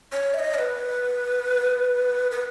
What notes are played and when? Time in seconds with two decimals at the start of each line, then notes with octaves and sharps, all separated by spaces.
0.13 C#5
0.34 E5
0.39 D#5
0.54 C#5
0.58 B4
2.31 B4